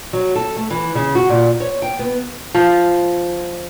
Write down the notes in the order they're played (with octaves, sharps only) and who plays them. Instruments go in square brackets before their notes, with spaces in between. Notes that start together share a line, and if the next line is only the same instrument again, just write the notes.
[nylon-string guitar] F#3
A4
A3
E3
C#3
F#4
A#2
C#5
G5
B3
[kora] F3